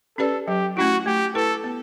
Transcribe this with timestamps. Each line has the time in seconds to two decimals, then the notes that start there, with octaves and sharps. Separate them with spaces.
0.18 C#4 G4 A4 B4 D5
0.47 F#3 G4
0.77 A3 C#4 E4 F#4
1.06 A3 G4
1.35 E4 A4 B4
1.64 B3